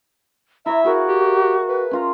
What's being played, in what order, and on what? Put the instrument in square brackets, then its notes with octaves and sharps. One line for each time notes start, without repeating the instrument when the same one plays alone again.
[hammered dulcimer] E4 C#5 [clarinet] E5 [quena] A#5
[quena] F#4 [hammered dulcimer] G#4 A#4 F5
[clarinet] G4
B4
[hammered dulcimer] C#4 F4 A#5